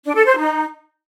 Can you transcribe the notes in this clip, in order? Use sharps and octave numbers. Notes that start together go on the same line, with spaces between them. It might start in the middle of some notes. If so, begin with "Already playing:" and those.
D4
A4
C5
D#4